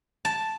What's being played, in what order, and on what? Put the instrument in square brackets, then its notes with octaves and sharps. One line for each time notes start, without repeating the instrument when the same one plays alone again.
[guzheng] A5